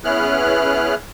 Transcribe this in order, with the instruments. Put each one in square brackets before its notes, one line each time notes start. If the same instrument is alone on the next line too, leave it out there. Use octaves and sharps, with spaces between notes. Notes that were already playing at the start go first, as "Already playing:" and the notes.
[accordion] B3 C#4 E4 G#4 F6 F#6